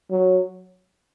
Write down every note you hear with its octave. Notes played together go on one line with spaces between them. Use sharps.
F#3